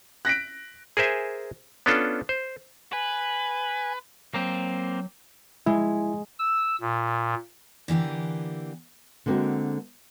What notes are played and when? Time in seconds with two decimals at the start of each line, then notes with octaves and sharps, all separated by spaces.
0.25 F#6 A#6 B6 D7
0.97 G#4 A#4 C5 E5 G#5
1.86 B3 C#4 D4 F4 A4
2.29 C5
2.93 B4 G#5
4.34 F#3 A#3 C4
5.66 G#3 E4
6.39 E6
6.81 A#2
7.88 D3 E3 A#3 G4
9.26 D3 G#3 A#3 C4 F#4